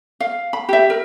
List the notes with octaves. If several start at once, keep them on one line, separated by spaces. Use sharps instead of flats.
F5
B5
G4 E5
A#4